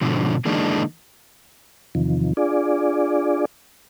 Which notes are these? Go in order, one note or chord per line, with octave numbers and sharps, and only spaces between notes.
G#2 B2 D3 F3
D3 E3 G#3 A#3 D4 D#4
E2 C3 D#3 F3
D4 F4 G#4 D5